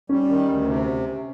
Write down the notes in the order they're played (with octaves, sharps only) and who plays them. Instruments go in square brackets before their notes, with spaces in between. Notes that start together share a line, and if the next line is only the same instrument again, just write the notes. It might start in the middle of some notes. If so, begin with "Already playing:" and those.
[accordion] G3 [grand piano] C#4
[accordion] D#3
D2
C3